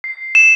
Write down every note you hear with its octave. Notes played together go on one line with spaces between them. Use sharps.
C7
E7